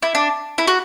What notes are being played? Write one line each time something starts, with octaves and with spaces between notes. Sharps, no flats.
E4
D4
E4
F#4